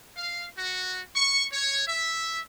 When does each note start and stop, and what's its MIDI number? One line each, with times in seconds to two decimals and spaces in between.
0.16 0.44 77
0.57 0.99 66
1.15 1.44 85
1.53 1.86 73
1.87 2.41 76